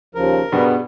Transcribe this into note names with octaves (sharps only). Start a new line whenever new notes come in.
D#2 C#3 F3 A#4
G2 B2 G3 B3 G#4